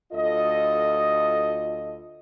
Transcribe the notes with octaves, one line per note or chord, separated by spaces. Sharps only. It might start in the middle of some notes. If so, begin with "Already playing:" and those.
D2 F4 A4 D#5